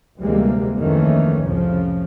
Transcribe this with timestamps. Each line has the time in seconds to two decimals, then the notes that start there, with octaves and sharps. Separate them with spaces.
0.22 D2 C3 E3 G3 G#3 A#3
0.80 F2 D#3 E3 A3 A#3 C#4
1.46 C2 F2 A2 C#3 F3